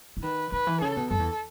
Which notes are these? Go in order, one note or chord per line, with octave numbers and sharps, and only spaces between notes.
E3
D#3 B4
D#3 B4
E3
C#3 A4
B2
F#2 A4
E2